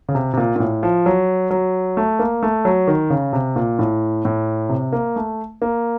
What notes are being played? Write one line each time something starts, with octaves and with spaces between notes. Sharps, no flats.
C#3
C3
C3
A#2
A#2
A2
F3
F#3
F#3
A3
A#3
A3
F#3
D#3
C#3
C3
A#2
A2
A2
C3
A#3
A3
A#3